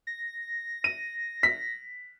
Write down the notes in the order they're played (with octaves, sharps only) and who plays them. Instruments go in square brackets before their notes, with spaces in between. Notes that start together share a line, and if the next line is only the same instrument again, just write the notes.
[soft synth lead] A#6
[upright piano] D#7
B6